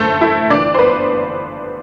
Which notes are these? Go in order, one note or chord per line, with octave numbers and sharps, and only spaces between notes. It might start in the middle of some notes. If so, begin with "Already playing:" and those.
Already playing: G1 F#2 D3 A3 A4 C5
E4 E5
G1 G2 E3 D4 D5
C5
B3 B4